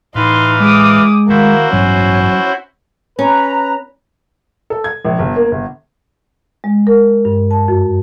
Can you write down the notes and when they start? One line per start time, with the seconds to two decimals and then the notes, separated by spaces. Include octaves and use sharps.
0.15 A2 E3 D#4 B4 F5 C6
0.60 G#3 D6 D#6
1.29 D#3 A3 A#3 E4 F#4 C5
1.73 A1 G2 F#3 B3 C#4 C#5
3.19 C#4 B4 A#5
4.70 A4
4.84 G#6
5.05 A#1
5.19 G1
5.36 A#3
5.51 G1
6.64 G#3
6.87 A#4
7.25 G2
7.51 A5
7.68 F#2